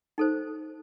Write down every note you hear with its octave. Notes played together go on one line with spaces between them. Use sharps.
D#4 A4 C5